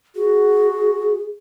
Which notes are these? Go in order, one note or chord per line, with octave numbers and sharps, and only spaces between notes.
F#4 G#4